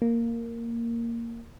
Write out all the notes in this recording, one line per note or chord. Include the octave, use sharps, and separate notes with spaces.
A#3